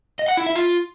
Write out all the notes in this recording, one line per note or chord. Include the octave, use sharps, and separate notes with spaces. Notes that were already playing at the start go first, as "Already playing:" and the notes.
D#5
F#5
E4
E5
F4